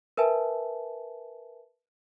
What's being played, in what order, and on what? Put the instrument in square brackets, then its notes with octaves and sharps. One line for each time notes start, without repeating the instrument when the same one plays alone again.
[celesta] A#4 B4 E5 G#5 A5